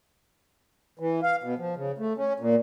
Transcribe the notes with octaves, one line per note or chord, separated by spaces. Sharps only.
E3
F5
B2
F3
C#3
A3
C#4
A#2